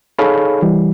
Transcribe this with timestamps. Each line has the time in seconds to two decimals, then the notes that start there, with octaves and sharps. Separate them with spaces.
0.18 D#4 G#4 A4 C#5 F5 B5
0.62 E3 G3